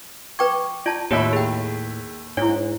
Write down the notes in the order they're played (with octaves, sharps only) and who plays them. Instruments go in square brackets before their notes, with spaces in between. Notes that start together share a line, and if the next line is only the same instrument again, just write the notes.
[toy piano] B4 G5 C#6 [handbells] D6 G#6
[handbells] F4 [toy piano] D5 A5
[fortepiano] D#2 E5 B5 [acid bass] A2 [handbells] G4 C#5
[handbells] G#4 G5
[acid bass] G#2 [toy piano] D4 E4 [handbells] C#5